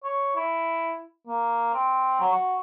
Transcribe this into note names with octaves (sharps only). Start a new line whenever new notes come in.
C#5
E4
A#3
C4
F#3
F#4